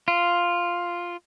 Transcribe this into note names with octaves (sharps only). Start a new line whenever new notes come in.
F4